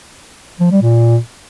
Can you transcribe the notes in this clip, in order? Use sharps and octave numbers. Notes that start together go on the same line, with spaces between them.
F3
G3
A#2